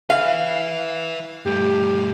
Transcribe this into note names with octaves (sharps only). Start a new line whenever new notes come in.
B4 E5 F5
G2 A3 G4